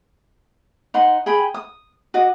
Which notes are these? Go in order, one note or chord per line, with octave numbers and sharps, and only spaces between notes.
D#4 F#5 C6
G#4 G5 B5
D#6
F#4 D#5 D6